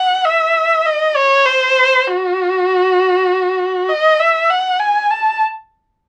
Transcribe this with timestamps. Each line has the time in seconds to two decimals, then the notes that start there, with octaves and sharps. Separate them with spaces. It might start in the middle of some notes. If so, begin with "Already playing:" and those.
Already playing: F#5
0.25 E5
0.86 D#5
1.16 C#5
1.46 C5
2.07 F#4
3.89 D#5
4.20 E5
4.50 F#5
4.80 G#5
5.10 A5